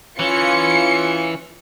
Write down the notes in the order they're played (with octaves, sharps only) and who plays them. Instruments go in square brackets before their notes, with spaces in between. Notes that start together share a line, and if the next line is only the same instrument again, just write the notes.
[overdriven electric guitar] E3 [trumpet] C#4 [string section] F4 [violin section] C#7